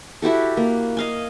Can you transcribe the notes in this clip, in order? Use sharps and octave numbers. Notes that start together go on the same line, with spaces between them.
E4 F#4 G4 A4
A#3
D#5 F5 G#5